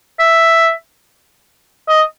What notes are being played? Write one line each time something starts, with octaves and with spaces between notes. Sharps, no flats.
E5
D#5